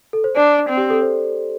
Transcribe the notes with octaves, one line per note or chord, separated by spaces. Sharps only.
A4
C5
D4 D5
C4
G4
A4
C5